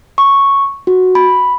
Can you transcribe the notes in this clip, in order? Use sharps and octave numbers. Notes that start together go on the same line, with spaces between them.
C#6
F#4
B5